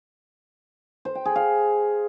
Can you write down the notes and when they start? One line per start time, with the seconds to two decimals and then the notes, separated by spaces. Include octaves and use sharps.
1.05 C5
1.15 G5
1.25 G#4
1.36 F5